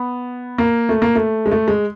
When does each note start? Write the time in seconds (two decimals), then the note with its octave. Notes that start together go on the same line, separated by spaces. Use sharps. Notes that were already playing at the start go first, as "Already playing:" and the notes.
Already playing: B3
0.58 A#3
0.89 A3
1.02 A#3
1.15 A3
1.46 G#3
1.51 A3
1.68 G#3